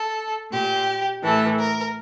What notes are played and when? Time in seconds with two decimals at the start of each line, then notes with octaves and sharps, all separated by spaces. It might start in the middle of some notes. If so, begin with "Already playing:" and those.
Already playing: A4
0.52 A#2 G4
1.23 A2 E3 A4
1.59 A#4